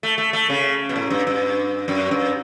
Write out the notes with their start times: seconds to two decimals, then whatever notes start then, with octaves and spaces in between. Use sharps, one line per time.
0.03 A3
0.18 A3
0.33 A3
0.50 C#3
0.89 B2
0.96 A2
1.10 G2
1.27 G2
1.88 F#2
2.11 G2